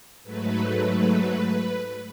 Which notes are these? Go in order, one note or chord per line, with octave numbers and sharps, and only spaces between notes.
G#2 F#3 A3 B4